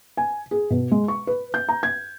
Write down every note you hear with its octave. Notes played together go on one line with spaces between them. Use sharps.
G#5
G#4
B2
G#3
C#6
B4
G6
A#5
G#6